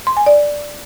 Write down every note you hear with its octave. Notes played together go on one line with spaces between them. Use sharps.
C6
G#5
D5